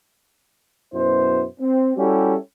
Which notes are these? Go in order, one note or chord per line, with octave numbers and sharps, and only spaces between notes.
F#2 B2 B3 E4 C5
C4
G3 C#4 E4 F#4 G4 A4